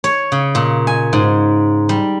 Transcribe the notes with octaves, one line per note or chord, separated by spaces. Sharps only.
C#5
C#3
A#2
G#5
G#2
G3